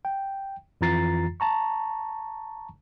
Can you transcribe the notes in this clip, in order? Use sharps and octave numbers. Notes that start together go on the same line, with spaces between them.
G5
F2 E3 F4 A#5 A6 C7
A5 A#5 C#6